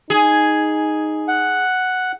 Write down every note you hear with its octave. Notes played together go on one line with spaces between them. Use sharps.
D#4 G#4
F#5